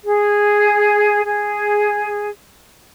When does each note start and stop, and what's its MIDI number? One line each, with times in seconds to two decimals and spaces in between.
0.05 1.21 68
1.25 2.30 68